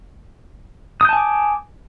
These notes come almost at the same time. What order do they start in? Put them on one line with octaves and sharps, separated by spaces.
D#6 G6 A5 G#5 D6